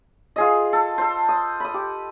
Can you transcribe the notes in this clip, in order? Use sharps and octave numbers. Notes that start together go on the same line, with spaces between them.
F4 G#4 D#5
A4
A4 C5
D#6
B5 D#6
G4